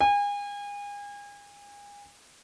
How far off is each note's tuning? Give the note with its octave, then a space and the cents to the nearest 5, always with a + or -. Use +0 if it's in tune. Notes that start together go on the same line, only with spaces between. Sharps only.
G#5 -35